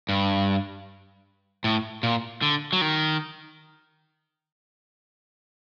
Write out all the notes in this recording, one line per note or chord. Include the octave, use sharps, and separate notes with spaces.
G2
A2
A#2
D3
F#3
D#3